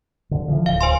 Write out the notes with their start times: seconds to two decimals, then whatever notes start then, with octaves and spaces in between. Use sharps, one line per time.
0.31 D3
0.48 D3 E3 F3
0.66 D1 F5
0.81 C5 G#5 C6